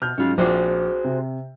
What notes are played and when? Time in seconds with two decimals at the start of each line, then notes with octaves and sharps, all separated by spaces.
0.02 B2 F6 G6
0.18 G#2 F#3 C#4 F4
0.38 A#1 F4 F#4 G#4 C5 D6
1.04 C3